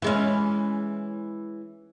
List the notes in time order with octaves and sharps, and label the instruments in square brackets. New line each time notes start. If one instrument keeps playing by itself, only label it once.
[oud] E3 G#3 C#4